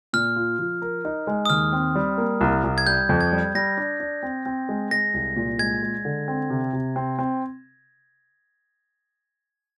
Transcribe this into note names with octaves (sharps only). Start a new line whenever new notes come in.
A#2 F6
F4
F3
A#4
D#4
G#3
D#6
D#2 F6
C4
G3
A#3
C2
C2
G#6
G3 G6
F2
G#6
G3
G3 A#6
D4
D4
C4
C4
G#3
G#3 A#6
C2
A#2
G#3 G#6
G#3
D3
C4
C3
C3
C4
C4